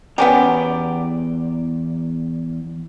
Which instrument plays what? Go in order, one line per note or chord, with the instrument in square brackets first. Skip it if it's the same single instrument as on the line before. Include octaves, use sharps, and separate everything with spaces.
[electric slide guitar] E2 D5 A#5 [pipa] B3 C#4 G4